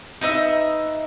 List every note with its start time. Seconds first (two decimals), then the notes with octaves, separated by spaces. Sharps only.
0.21 D#4 B4 D#5 E5